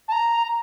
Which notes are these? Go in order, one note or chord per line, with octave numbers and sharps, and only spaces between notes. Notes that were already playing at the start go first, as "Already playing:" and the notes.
A5
A#5
A#5